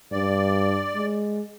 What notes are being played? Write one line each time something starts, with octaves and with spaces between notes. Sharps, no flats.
G2 D5
G#3